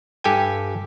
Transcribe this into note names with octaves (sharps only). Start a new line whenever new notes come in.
G2 G4 A4 G5 G#5